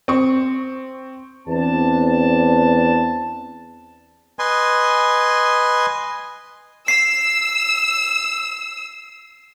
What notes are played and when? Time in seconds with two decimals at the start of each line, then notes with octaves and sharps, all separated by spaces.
0.08 C4 C#6
1.47 E2 C4 D4 A5
4.39 B4 D#5 G#5 C6
6.88 E6 C7